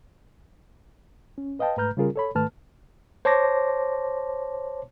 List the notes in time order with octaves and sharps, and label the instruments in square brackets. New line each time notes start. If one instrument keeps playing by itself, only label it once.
[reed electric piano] C#4
B4 D#5 F5 G5 A5
G#2 A3 B4 A#5 F6 G6
C#3 G3 C#4 F4 G#4 A#4
A4 C#5 B5
G#2 D#3 A3 B4 A5 F6
[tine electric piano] C5 C#5 A5 C6 D6 A#6